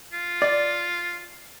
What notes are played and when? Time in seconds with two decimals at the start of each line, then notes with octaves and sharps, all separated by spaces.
0.13 F4
0.42 D5